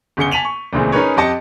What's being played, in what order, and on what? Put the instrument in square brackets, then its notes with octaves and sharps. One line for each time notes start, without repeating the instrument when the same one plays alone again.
[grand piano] G1 C#3 G#4 C#7 G7
G#5 A5 B6 D#7 F7 F#7
C#6
C#2 A#2 E3 G#3 A3 C4
C#4 D#4 G#4 A#4 B4 C#5
F2 G4 D#5 A5 C#7